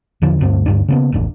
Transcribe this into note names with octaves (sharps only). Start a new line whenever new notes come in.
E2 D3 F3
D2 G2 C4
D2 G2 D4
C#3 A#3 B3
E1 A1 D4